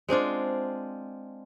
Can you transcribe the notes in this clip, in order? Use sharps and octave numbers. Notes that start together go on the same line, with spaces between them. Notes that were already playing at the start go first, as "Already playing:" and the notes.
G#3 C4 D4 F4